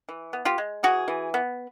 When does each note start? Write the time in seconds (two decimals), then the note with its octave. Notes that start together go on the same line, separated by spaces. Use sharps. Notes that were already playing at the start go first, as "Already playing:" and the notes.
0.09 E3
0.33 B3
0.45 F4 G4
0.58 G#3
0.83 E3 F#4 G#4
1.08 E3
1.34 B3